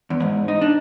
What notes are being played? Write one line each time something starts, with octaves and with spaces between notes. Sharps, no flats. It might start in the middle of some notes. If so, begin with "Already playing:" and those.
E2
G#2
D#4
D4